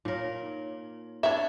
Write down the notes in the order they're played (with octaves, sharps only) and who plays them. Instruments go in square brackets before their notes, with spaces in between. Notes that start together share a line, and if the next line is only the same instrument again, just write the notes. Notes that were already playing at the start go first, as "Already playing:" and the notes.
[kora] A#2 A#4 [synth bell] D#4 C#5
[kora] B3 D4 E4 [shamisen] C#5 E5 [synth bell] C#6